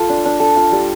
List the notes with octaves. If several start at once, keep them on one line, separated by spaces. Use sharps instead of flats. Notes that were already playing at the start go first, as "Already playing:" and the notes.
Already playing: F4 A4
D4
D4
A4
F4
G3